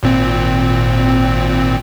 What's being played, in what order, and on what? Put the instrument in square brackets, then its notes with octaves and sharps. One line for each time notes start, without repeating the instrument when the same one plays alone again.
[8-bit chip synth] G#1 A#2 C4